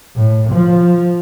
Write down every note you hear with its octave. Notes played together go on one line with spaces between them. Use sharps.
A2
F3